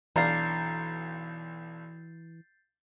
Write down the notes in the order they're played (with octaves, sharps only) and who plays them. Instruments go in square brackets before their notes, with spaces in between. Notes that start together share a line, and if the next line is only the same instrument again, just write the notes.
[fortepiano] B1 D4 [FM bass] E3 [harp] F5 A#5 [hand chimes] G6 A6 C7